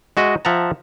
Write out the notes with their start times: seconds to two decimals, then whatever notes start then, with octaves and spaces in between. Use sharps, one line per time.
0.17 G#3 F#4 D#5 E5
0.45 F3 E5 F#5 A5 A#5